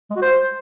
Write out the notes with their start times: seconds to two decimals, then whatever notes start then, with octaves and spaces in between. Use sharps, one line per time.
0.10 G#3
0.16 F#4
0.22 C5